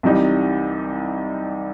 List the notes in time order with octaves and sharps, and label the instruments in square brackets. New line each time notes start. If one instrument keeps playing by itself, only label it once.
[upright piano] C2 C3 E3 G3 D#4